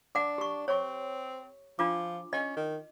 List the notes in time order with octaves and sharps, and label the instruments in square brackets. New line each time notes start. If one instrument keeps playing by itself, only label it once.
[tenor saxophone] D4 [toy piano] F#5 D6
[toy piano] G4 C#6
[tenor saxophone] C4 [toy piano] C#5 C#6
[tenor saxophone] F3 [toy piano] D4 F4 D6
[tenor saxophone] C#4 [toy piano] D#5
[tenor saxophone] D#3